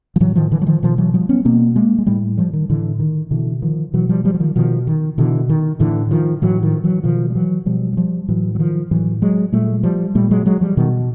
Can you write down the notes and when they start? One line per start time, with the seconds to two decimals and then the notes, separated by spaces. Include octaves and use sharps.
0.16 F3
0.20 A2 E3 F#3
0.36 D#3 F3
0.52 D3 E3
0.62 F#3
0.67 D#3 F3
0.83 B2 D#3 F3
0.98 E3 F#3
1.14 F3 G3
1.29 B3 C#4
1.45 B2 A#3 C4
1.76 G#3 A#3
1.99 G#3
2.07 A2 G3 A3
2.37 F3 G3
2.53 D#3
2.69 A2 D3 E3
3.00 D#3
3.31 B2 D3 E3
3.62 D#3 F3
3.94 B2 E3 F#3
4.09 F3 G3
4.25 F3 G3
4.34 F#3
4.40 D#3 F3
4.56 B2 D#3 F3
4.87 D#3
5.18 B2 D3 E3
5.49 D#3
5.80 A2 D3 E3
6.11 D#3 F3
6.42 A2 E3 F#3
6.63 D#3 F3
6.84 E3 F#3
7.04 B2 D#3 F3
7.30 G3
7.35 E3 F#3
7.66 B2 F3 G3
7.93 F#3
7.97 F3 G3
8.28 A2 E3 F#3
8.55 F#3
8.59 D#3 F3
8.91 A2 E3 F#3
9.22 F#3 G#3
9.52 A#2 G3 A3
9.83 F3 G3
10.15 A#2 G3 A3
10.31 F#3 G#3
10.46 F#3 G#3
10.61 F3 G3
10.77 B2 D#3